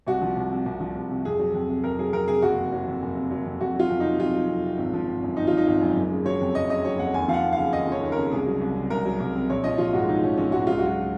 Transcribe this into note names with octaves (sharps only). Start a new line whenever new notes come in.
C2 F#4
F3
C2
C3
C2
F3
C2
C3
F2 G#4
F#3
F2
C3
F2 A#4
F#3 G#4
F2 A#4
C3 G#4
F#1 F#4
C3
F#3
F2
F#1
C3
F#3
F2
F2 F#4
F#3 F4
F2
C3 D#4
F2 F4
F#3
F2
C3
G#1
F3
G#1
F#2
G#1 D#4
F3 F4
D#4
G#1
F#2
F#1
C#3
F#3 C#5
F2
F#1 D#5
C#3 D#5
F#3 C#5
F2 F#5
D#2 G#5
F3 F5
F#5
D#2
F5
C#3
D#2 D#5
F3 C#5
D#2
C#3 A#4
C2 G#4
F#3
C2
C3
C2 A#4
F#3
C2
C3
A#1 C#5
F3 D#5
A#1 F4
G#2 F#4
A#1 D#4
F3 C#4
A#1 C#4
G#2 F#4
C#2 F4
F#4
F#3 F4